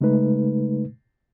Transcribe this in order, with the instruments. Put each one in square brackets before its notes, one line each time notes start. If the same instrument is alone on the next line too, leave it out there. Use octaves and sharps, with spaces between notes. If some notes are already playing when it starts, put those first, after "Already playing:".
[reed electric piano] C#3 G#3 A3 D#4 B4